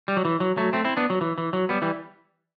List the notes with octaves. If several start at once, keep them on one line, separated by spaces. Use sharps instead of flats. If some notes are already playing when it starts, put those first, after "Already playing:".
G3
F#3
E3
F#3
F#3 A3
A3 C4
C4 E4
B3 D4
F#3
E3
E3
F#3
G3 B3
E3 G3